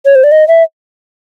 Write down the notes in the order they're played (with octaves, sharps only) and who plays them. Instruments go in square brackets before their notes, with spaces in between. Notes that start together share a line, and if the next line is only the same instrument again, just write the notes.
[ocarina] C#5
C5
D5
D#5
E5